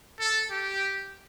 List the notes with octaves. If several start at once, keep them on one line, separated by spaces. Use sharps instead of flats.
A4
G4